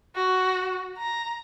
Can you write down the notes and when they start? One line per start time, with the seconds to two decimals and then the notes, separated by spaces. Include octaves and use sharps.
0.15 F#4
0.98 A#5